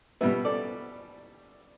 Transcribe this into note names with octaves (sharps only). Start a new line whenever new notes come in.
B2 G3 B3 B4 E5
A4 D5